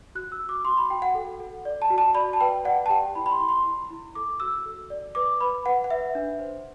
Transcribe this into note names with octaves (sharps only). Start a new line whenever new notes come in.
F#4 F#6
E6
F#4
D6
F#4 C6
B5
F#4 G5
F#5
A4
A4
D5
A5
F#4
A5
D5 B5
A5
B4 G5
D5 F#5
A5
G4 G5
E4 B5
B5
C6
E4
C6
E4
E4
A4 D6
F#4 E6
A4
D5
B4 D6
B4 B5
B4 F#5
F#5
B4 E5
D4
C5